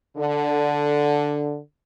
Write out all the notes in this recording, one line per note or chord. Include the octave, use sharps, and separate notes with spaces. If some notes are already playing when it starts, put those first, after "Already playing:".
D3